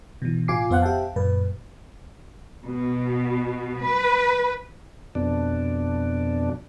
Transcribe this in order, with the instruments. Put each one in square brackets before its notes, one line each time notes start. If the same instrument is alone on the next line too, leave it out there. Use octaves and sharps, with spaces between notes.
[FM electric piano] B2 E3
A2 F4 G#5 D6 C7
F2 B3 C5 F5 F#5 F#6
G4 E5 F5 G5 A5
F#2 A#2 B4
[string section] B2
B4
[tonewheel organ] F2 B2 D4